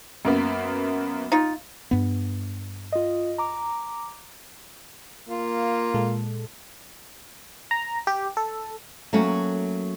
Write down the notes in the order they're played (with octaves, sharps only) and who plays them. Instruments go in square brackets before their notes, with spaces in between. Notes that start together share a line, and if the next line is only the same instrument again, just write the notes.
[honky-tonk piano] F#2 A#3 B3
[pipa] D#4 F4
[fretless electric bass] G2 B3
[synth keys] F4 D#5
A#5 D6
[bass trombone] A#3 [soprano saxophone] F4
[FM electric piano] A#2 G#3 A4
A#5
G4
A4
[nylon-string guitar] F#3 A3 A#3 C#4 F#4